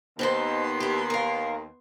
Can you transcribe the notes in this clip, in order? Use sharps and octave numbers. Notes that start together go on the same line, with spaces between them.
D#2 B3 C4 D#4 C5 C6
E4 G4
A#4 F5